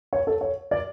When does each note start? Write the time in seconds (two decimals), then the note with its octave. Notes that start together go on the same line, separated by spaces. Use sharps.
0.13 C#5
0.27 A4
0.41 C#5
0.71 D5